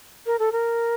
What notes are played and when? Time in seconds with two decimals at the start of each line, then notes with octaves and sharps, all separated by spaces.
0.26 A#4
0.39 A4
0.52 A#4